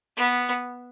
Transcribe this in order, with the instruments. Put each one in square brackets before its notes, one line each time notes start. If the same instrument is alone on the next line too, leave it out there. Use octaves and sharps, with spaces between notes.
[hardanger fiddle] B3